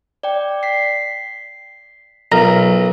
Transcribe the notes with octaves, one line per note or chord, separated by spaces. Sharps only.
D5 G5
B6 C7
B1 F4 A#4